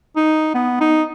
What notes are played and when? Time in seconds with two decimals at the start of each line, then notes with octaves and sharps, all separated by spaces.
0.16 D#4
0.54 B3
0.81 D#4